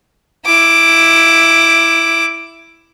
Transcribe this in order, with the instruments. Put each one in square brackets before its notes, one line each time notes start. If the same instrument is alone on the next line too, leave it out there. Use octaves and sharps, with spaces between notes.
[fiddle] E4 D6